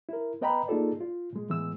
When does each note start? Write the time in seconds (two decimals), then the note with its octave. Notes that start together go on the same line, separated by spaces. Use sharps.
0.09 E4 A#4
0.41 B3 B4 D#5 G5 A#5 B5
0.68 A#3 D#4 F4 G#4 A4 D5
1.01 F4
1.33 A#2 G#3
1.49 A2 E3 G#3 B3 E6